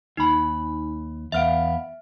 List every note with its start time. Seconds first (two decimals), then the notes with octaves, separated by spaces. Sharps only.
0.17 D#2 D#4 G#5 B5
1.32 E2 B3 E5 F5 F6 D7